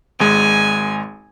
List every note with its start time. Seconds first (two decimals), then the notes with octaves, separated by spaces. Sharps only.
0.20 G#1 G#3 G#5